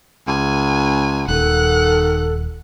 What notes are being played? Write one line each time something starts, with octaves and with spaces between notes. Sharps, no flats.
C#2 G#5
D#1 D#3 A4 F#5 F#6